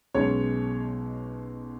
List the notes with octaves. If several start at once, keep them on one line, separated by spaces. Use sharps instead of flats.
B1 B2 G#3 C#4 C#5